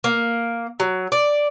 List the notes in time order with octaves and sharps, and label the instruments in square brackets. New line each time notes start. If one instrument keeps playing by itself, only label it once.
[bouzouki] A#3
F#3
D5